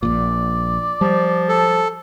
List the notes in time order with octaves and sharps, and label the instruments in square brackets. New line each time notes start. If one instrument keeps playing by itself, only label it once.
[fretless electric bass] A#1 A#2 [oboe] D5
[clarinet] F3 [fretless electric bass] G3
[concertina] A4